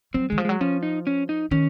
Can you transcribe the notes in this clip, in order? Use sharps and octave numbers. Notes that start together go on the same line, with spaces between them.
F#3 C4
D#3 G#3
F3
F#3 G#3
F3 C#4
D#4
C#4
D#4
D#3 C#4